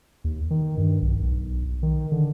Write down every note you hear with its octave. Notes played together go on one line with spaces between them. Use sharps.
D#2
D#3
G2
B1
B1
D#3
D3